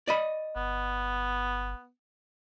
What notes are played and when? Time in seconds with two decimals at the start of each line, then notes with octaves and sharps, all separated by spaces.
0.07 D5 D#5 B5
0.56 G1 B3